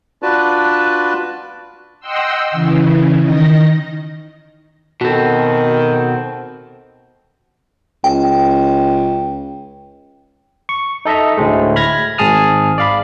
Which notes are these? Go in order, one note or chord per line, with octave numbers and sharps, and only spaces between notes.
D4 F4 F#4 B4 D5 A5
D#5 F#5 G5 C6 E6
C#3 E3
D#3 D#5 A#6
B2 D#3 C4 F#4 A4
C#2 G5
C#6
D#4 A4 D#5 E5 A#5
D2 A2 G#3 A3
B5 F6 G#6 A#6
G#1 G#2 G#4 A5 D#6 F6
D5 F5 B5